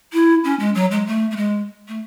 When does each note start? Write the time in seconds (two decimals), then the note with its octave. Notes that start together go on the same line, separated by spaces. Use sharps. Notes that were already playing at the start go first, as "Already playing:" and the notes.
0.13 E4
0.44 C#4
0.59 G#3
0.75 F#3
0.91 G#3
1.07 A3
1.31 A3
1.37 G#3
1.88 A3